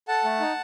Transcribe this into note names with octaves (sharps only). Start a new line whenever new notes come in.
A4 F#5 A5
A3
D#4